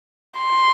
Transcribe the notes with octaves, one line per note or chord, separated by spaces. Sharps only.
C6